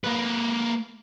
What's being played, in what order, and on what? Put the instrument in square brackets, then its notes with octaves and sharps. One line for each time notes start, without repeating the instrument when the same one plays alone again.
[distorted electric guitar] A#3 B4